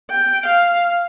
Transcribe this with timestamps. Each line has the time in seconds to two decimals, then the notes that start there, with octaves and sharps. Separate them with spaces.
0.11 G5
0.46 F5